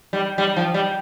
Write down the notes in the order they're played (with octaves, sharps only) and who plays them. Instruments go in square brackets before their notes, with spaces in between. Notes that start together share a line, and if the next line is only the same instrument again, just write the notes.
[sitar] G3
G3
F3
G3